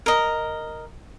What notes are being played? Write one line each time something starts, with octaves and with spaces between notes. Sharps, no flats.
A#4 D#5